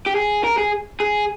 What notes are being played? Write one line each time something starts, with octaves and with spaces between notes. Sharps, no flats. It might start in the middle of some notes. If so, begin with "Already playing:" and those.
G4
G#4
A#4
G#4
G#4